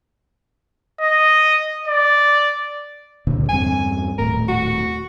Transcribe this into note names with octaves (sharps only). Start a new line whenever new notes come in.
D#5
D5
C#2 A#2 D3
E2 G2 C4 G#5
D#1 A2 A#4
F#4